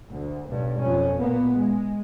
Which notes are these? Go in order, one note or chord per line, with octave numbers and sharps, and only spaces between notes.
D2
B1 G2
F2 C#4
A#2 A#3 B3
G#3